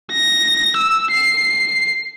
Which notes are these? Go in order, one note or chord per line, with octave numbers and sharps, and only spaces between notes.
A#6
E6
C7